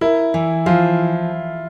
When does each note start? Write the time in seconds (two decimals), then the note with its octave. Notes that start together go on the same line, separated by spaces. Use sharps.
0.01 E4 A#4
0.34 E3
0.66 F3 F4